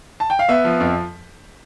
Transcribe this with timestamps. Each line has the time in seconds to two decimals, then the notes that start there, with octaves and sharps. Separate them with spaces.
0.20 A5
0.30 G5
0.39 F5
0.49 B3 E5
0.64 F3
0.80 F2